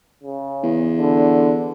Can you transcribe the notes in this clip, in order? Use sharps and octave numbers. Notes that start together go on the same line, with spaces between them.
C#3
E2
D3